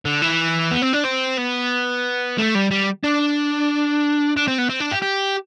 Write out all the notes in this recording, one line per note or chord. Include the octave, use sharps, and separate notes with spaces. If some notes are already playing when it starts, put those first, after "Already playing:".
D3
E3
B3
C4
D4
C4
B3
A3
G3
G3
D4
D4
C4
B3
C4
D4
G4
G4